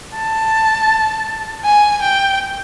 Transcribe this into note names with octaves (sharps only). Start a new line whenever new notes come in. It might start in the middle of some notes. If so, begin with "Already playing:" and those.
A5
G#5
G5